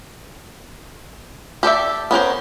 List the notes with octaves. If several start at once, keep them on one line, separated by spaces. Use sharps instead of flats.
G4 A4 D5 E5
B3 C#4 A#4 C5